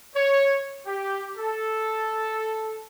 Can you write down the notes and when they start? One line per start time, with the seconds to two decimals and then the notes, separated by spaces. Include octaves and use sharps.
0.15 C#5
0.86 G4
1.38 A4